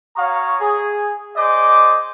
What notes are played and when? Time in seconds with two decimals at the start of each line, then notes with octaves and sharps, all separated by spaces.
0.17 F#4 C#5 F5 A#5 C#6 D#6
0.60 G#4
1.37 G#4 C5 D5 D#5 D6